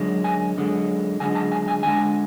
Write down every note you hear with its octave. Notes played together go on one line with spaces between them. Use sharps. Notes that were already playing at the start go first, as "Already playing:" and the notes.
Already playing: F#2 D3 G#3
G#5
F#2 D3 G#3
F#2 D3 G#3 G#5
A5
G#5
G#5
F#2 D3 G#3 G#5